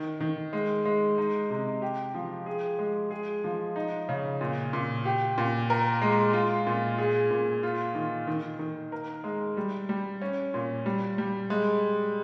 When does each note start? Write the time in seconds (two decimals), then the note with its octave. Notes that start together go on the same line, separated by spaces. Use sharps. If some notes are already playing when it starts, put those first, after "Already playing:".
Already playing: D#3
0.21 D#3
0.53 G#3
0.85 G#3
1.18 D#4
1.50 C3
1.82 G4
2.15 F3
2.46 G#4
2.79 G#3
3.11 G#4
3.44 F3
3.76 D#4
4.09 C#3
4.41 A#2
4.73 A#2
5.05 G4
5.38 A#2
5.70 A#4
6.02 G#3
6.33 F4
6.67 A#2
6.98 G#4
7.31 A#2
7.63 F4
7.95 D#3
8.27 D#3
8.59 D#3
8.92 A#4
9.24 G#3
9.57 G3
9.89 G3
10.22 C#4
10.54 A#2
10.86 G3
11.18 G3
11.50 G#3